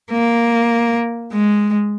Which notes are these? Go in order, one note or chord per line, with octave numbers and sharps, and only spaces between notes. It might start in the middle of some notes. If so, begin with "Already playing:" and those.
A#3
G#3